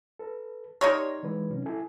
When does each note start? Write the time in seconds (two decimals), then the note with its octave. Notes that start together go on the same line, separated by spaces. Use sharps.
0.19 A4 B4
0.81 D#4 G4 A#4 C#5 D5 C6
1.23 E3 G#3 B4
1.50 C3 F#3 C#4
1.66 E4 A4 G#5